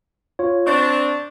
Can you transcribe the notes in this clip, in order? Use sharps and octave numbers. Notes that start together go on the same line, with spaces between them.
F4 C#5
C4 D4 C#6